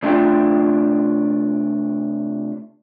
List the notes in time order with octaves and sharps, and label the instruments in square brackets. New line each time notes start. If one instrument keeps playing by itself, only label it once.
[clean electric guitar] C3 A3 C4 D4 F4 G5